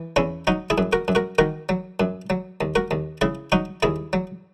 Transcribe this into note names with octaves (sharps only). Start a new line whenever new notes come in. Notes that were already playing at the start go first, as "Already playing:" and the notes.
Already playing: E3
E2 C#4 E4
F#3 D#4 F#4
E4 G#4
F#2
F#4 A#4
F#2
F#4 A#4
D#3 F#4 A#4
F#3
F#2
F#3
D#2
F#4 A#4
D#2
C#3 E4 G#4
F#3 D#4 F#4
D#2 E4 G#4
F#3